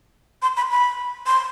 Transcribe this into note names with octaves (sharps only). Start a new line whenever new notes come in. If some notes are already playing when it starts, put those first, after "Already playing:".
C6
B5
B5
C6